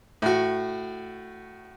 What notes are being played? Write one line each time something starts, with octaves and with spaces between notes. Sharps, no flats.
A2 F#4